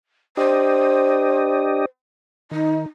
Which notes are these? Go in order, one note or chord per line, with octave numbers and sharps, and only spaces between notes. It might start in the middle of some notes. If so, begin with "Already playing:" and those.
D4 G4 C5 D#5
D#3 D#4